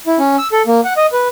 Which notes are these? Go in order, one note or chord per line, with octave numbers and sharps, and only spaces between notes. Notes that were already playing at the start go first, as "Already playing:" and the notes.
E4
C#4
E6
A4
A#3
F#5
D#5
B4